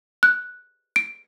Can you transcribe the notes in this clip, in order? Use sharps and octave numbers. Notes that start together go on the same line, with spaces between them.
F#6
D7